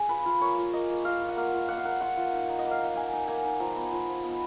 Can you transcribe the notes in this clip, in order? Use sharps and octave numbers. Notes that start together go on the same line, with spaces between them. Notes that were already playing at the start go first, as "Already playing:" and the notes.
Already playing: G#4
F4 B4
F4
A#3 C#5
F4
A#3 D#5
A#3
F4 F5
F4
F#5
A#3 F5
F4
A#3 F#5
F5
A#3 F#5
F4 F#5
F4
D#4
D#4
D#5
A#3
F5
D#4 F#5
D#4 G#5
D#4
A#3 G#5
D#4
F3 A#5
B3
F3
F3
B3